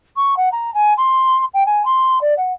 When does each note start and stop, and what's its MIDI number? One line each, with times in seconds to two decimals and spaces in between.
0.16 0.35 85
0.37 0.49 78
0.52 0.73 82
0.74 0.93 80
0.97 1.44 84
1.54 1.63 79
1.66 1.83 80
1.85 2.21 84
2.21 2.34 74
2.37 2.53 78